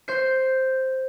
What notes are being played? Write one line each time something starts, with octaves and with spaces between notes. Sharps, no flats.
C5 G6 C7